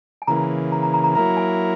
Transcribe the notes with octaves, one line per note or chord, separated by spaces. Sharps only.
G#5
C#3 E3 A#3 A#5
A#5
A#5
A#5
A#5
F#3 A#3 E4 A#4 A#5
G#5